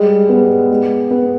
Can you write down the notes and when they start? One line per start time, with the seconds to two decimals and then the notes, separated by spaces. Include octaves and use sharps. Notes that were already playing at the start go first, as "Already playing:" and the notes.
Already playing: G3 G#3
0.29 B3
0.70 G#3
1.11 B3